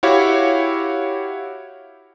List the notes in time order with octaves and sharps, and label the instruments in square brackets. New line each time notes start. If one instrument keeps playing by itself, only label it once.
[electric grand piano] E4 F#4 G4 C#5 F5